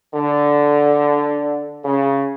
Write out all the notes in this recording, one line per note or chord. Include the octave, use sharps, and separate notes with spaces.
D3
C#3